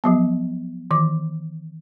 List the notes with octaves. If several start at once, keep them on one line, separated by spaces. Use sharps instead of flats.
F3 F#3 B3
D#3 E3 D6